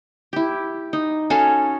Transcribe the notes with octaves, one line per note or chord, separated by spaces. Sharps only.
E4 G4
D#4
C#4 F#4 A4 F5